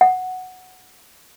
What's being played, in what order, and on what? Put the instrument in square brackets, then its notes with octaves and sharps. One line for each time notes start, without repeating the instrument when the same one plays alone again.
[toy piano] F#5